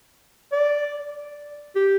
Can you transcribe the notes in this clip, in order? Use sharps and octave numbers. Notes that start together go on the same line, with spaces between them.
D5
G4